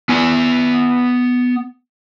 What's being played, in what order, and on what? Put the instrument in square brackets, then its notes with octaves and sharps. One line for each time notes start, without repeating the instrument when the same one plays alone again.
[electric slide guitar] B3 G#5